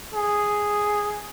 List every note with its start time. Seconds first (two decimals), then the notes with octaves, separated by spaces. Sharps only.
0.14 G#4